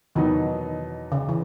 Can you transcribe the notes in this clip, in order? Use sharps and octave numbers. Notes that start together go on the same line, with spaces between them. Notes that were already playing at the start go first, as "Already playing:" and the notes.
E2 B2 D#3 F#3 B3 D#4
C#3
E3